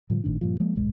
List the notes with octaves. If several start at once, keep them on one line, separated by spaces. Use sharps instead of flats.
A2 D3 F3 G3
G#1 A2 D#3 D4
G2 A#2 F3
F3 G#3 A#3
D1 B1 G#2 G#3